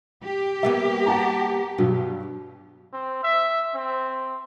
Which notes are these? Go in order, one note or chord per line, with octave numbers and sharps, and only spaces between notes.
G4
G3 A#3 B3 E5
F#5 A5 A#5
G2 B2 F#3
C4
E5
C4